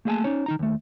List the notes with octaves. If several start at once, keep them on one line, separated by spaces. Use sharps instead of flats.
A3 A#3 G#4 D#5 G#5 A5
C#4 D#4 C#5
D#3 D#4 A#5
D#2 A3